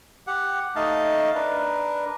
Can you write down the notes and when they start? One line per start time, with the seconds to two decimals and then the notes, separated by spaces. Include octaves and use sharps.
0.27 G4 F#5
0.76 A3 D#4 D#5 F5 A5
1.35 D4 A#4 B4